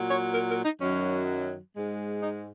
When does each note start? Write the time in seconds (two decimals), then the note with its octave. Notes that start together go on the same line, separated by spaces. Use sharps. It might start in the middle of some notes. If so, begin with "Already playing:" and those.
Already playing: A#2 F#3
0.11 C#5
0.34 A#4
0.50 A#4
0.65 D#4
0.82 F#2 D#3 F#3 C#4
1.75 G#2 G#3
2.23 D#4